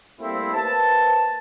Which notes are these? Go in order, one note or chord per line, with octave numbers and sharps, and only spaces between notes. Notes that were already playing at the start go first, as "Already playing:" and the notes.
G3 A3 A#3 C4 E4
A#3 B4 C5 A5